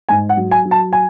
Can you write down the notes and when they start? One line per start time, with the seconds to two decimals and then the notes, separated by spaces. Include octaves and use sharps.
0.09 G#2 G#5
0.29 F#5
0.37 F#3
0.51 G#5
0.65 F#3
0.71 A5
0.93 G#5